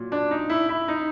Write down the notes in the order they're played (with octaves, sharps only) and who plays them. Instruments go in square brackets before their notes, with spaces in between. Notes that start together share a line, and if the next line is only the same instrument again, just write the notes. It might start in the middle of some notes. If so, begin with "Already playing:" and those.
Already playing: [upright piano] A#2 F#3
D4
D#4
E4
E4
D#4